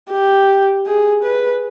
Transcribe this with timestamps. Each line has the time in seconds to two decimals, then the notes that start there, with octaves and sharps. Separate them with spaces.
0.11 G4
0.87 G#4
1.24 B4